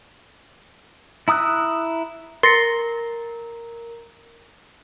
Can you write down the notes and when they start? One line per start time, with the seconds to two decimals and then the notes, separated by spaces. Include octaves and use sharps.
1.28 E4 A#5 D#6 E6 F#6
2.43 A#4 C6 A6 A#6 C#7